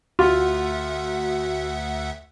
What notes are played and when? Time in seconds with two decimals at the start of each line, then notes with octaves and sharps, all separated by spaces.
0.19 D2 F4 F#4 E5 F#5